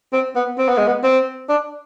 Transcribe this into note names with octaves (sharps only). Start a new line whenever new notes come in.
C4
B3
C4
B3
G#3
B3
C4
D4